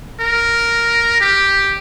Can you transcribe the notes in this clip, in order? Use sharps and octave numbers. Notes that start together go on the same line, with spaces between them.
A#4
G4